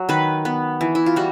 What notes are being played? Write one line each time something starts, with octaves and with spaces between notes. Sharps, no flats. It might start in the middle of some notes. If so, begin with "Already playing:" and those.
Already playing: F#3
D#3 B4
B3
E3
E4
F4
G3 F#4